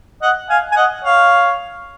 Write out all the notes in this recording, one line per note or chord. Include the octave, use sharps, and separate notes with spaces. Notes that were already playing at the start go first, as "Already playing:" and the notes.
D#5 F#5
F5 G#5
G#5
D#5 F#5
C#5 F5